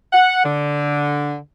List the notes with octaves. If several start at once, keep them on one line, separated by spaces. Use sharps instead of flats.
F#5
D3